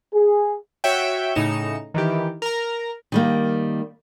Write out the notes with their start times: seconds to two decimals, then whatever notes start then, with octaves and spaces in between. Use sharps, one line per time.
0.13 G#4
0.84 F#4 C#5 E5 G5
1.35 A2 C#3 D#4 C#7 E7
1.94 D#3 E3 G4
2.42 A#4 A#5
3.12 D#3 G3 A#3